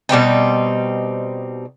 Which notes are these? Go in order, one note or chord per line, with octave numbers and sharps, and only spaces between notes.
B2 G3 C4 D#4